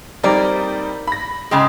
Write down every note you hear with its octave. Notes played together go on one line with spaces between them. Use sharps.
G3 A#3 C4 D#4 D5
B5 A#6
G#2 C#3 G#3 G5